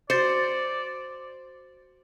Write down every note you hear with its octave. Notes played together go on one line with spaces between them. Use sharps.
F#4 C5 D5 A6 C#7